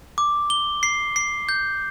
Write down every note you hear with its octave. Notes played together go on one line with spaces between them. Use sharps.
D6
G7
C7
C7
G6